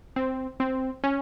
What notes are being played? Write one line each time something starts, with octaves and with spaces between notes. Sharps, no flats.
C4
C4
C#4